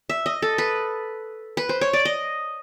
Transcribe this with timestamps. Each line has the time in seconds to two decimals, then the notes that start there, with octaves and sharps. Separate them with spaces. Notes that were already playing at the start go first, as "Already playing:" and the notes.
0.09 E5
0.26 D#5
0.42 A4
0.58 B4
1.57 B4
1.69 C5
1.81 C#5
1.93 D5
2.05 D#5